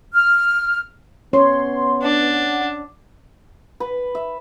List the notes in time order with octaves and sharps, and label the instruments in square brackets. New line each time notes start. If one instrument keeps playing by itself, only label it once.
[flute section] F6
[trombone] B3 [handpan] C#4 C#5 [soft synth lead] C6
[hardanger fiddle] D4 [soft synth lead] F#5
[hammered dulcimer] B4
E5